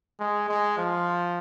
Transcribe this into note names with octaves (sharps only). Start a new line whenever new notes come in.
G#3
G#3
F3